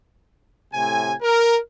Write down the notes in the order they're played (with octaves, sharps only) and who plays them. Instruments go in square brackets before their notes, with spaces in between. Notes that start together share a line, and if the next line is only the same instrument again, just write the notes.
[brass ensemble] A2 C3 G#5
A#4